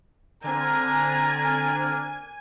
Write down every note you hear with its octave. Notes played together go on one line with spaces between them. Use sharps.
D3 C4 D4 A#4 G#5 A#5